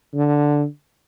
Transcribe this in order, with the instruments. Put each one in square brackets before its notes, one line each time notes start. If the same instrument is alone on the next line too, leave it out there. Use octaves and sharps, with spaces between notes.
[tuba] D3